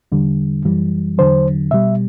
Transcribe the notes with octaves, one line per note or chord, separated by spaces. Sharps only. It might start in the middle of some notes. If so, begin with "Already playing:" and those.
E2 D3 G3
F#2 E3 G3
E2 D3 F#3 C5
B2 G3 E5